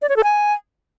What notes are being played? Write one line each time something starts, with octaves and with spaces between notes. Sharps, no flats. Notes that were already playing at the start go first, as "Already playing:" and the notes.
D5
C#5
A4
G#5